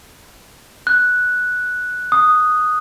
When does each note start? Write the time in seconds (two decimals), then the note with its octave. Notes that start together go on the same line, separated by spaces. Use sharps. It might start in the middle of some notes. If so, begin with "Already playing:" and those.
0.87 F#6
2.12 D#6